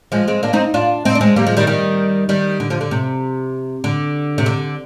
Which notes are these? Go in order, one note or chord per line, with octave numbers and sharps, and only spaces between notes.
F3 G#3
G#3 C4
A#3 D4
C4 D#4
D4 F4
C4 D#4
D4
G#3 C4
G3 A#3
F3 G#3
D#3 G3
D#3 G3
D#3 G3
D3
D3 F3
D3
C3
D3
C3
D3